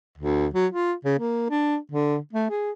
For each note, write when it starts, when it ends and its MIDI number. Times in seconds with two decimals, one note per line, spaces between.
0.18 0.47 38
0.54 0.67 54
0.73 0.93 65
1.05 1.16 49
1.19 1.48 58
1.50 1.77 62
1.92 2.18 50
2.33 2.47 57
2.50 2.72 68